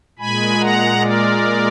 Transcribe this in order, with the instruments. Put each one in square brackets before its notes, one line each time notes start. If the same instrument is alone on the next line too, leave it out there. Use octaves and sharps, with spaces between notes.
[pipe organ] A#2 G#3 G#5 B5
F#5 A#5
A#4 D5